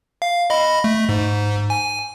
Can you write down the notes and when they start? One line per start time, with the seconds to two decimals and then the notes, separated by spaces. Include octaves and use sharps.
0.22 F5
0.50 D#5 B5
0.84 A3
1.09 G#2
1.70 G#5